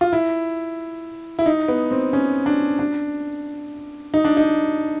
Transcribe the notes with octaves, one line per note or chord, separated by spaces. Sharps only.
F4
E4
E4
D#4
B3
C4
C#4
D4
D4
D#4
D4
D#4